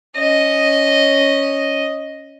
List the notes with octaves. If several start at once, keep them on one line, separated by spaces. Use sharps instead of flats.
C#4 D#5